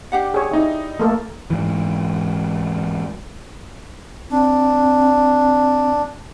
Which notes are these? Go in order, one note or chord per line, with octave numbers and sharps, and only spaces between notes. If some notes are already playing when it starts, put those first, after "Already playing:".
D4 G4 F#5
G#4 C#5
D#4 E4
A3 A#3 A4
G#2 E3
C4 D4